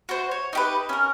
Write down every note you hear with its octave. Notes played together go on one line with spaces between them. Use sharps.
F#4 C5
C#5
D#4 G4 B4
C#4 A#4